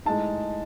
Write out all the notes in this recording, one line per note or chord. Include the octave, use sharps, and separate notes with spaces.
A2 G#3 D#4 A5